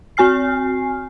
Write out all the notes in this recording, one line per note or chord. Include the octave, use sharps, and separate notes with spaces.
C4 F#4 G#5 F6 C7